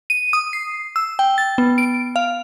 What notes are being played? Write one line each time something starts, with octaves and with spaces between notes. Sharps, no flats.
D#7
D#6
C7
E6
G5
A6
B3
D7
F5